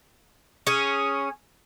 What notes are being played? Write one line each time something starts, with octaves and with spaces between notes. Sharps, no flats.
C#4 G#4